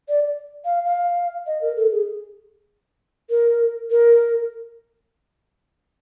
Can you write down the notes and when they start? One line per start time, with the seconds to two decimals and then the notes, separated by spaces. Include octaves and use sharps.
0.09 D5
0.65 F5
0.85 F5
1.47 D#5
1.61 A#4
1.77 A4
1.92 G#4
3.30 A#4
3.91 A#4